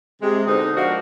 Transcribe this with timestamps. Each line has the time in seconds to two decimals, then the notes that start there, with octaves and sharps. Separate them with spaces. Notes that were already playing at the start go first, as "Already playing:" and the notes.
0.22 C3 G#3
0.47 B2 D3 D#4 C5 D#5
0.77 F3 G#3 A#3 D4 F#4